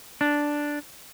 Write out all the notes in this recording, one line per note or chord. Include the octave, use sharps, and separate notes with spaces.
D4